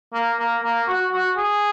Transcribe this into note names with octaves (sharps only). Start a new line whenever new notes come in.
A#3
A#3
A#3
F#4
F#4
G#4